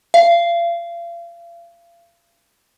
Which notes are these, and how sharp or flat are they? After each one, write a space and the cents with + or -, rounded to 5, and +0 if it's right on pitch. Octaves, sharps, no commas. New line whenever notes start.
F5 -35